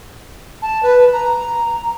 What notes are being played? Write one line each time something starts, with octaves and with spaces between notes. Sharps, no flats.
A5
B4
A#5